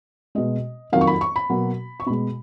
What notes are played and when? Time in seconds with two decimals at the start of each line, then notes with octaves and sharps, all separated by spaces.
0.35 B2 G#3 D#5
0.92 F2 D#3 F#3 A#3 F5
1.01 C#6
1.07 B5
1.21 C#6
1.36 B5
1.49 B2 F#3 A#3
2.00 C#6
2.06 B2 G#3 B5